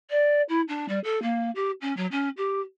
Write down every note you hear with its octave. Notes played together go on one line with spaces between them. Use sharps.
D5
E4
D4
G3
A4
A#3
G4
C#4
F#3
C#4
G4